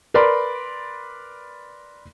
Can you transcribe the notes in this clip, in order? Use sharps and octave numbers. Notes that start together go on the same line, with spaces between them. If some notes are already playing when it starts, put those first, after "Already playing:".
A#4 B4 D5 B5 C6